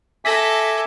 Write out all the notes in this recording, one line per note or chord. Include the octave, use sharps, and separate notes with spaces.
A4 E5 G#5 D6 A#6 B6